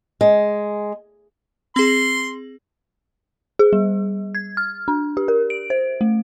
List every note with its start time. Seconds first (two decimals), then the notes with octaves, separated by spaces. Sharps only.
0.21 G#3
1.76 C4 G#4 C6
3.59 G#4
3.73 G3
4.35 G#6
4.57 F6
4.88 D4
5.17 G4
5.28 A#4
5.50 D7
5.70 C5
6.01 A3